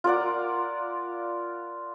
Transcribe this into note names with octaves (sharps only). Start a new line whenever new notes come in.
F4 A#4 D5 F#5